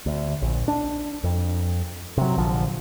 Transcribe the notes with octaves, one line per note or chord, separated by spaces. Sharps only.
D2
A#1
D4
F2
C3 F#3
A#1 D3 F3